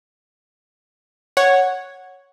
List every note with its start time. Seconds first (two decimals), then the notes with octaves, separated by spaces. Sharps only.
1.37 C#5 F#5 G#6